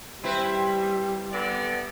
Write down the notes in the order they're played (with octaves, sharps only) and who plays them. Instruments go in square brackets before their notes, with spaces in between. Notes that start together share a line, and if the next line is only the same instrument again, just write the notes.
[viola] G3 [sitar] C4 E4 B4
[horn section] D3 B3 D5